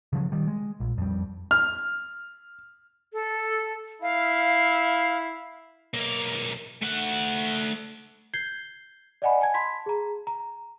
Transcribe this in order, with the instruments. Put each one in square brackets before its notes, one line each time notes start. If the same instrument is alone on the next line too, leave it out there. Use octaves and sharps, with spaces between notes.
[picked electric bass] C#3 F3 F#3
D#3 G3
G#3
A#1
F2 G3
[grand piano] F6
[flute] A4
[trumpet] E4 [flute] F5
[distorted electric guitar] B1 A#3
A3 F#5
[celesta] G6 G#6 C7 G7
D5 D#5 F#5 G#5 B5
G#5 A5 G#6
A5 B5 C6 G#6 B6
G#4 A#5
A#5